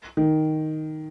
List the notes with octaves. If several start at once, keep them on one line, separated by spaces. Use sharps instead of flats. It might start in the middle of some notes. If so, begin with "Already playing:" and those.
D#3